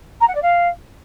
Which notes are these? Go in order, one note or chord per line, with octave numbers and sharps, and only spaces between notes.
A#5
F#5
D5
F5